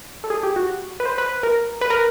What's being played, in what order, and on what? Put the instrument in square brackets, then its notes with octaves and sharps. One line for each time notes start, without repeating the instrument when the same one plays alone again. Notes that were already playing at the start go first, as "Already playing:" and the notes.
[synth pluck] A4
G#4
G4
F#4
B4
C5
B4
A#4
B4
A#4